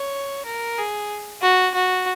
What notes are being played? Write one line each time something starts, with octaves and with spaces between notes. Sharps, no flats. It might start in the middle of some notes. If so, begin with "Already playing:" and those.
Already playing: C#5
A#4
G#4
F#4
F#4